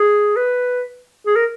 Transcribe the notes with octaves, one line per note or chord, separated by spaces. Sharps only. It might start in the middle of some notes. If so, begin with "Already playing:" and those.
Already playing: G#4
B4
G#4
A#4